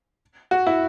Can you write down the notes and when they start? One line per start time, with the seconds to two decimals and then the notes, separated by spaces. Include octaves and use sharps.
0.51 F#4
0.67 E4